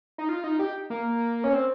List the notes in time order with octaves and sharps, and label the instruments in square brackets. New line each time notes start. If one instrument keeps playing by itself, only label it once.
[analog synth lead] D#4
F4
D#4
G4
A#3
C#4
C4